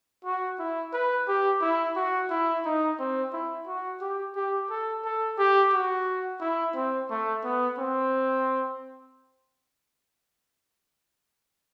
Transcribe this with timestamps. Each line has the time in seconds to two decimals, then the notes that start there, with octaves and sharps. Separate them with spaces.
0.25 F#4
0.59 E4
0.93 B4
1.28 G4
1.62 E4
1.96 F#4
2.30 E4
2.65 D#4
2.99 C4
3.33 E4
3.67 F#4
4.01 G4
4.36 G4
4.70 A4
5.05 A4
5.38 G4
5.73 F#4
6.41 E4
6.76 C4
7.10 A3
7.44 B3
7.78 C4